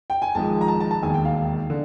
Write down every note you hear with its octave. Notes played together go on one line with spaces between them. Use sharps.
G5
G#5
G#1 G#2 F3 G#3 A5
A#5
A5
A5
A5
E1 D#2 D#3 G#5
G5
F5
D3